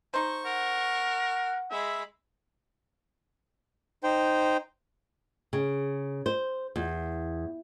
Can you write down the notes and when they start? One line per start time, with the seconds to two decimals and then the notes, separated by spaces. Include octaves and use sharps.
0.14 D#4 C5 C#6
0.46 A#4 F#5
1.71 G#3 E5 B5
4.03 D#4 C5 G5
5.53 C#3
6.26 C5
6.76 E2